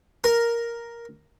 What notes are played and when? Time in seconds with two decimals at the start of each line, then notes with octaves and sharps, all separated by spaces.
0.24 A#4